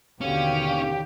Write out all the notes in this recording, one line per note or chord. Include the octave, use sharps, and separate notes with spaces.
D#2 B2 D3 C#4 G4 F5